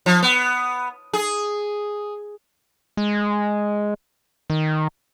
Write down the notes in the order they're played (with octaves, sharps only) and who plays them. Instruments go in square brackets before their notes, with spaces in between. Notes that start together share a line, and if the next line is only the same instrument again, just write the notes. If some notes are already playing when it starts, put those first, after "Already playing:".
[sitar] F3
B3
G#4
[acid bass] G#3
D#3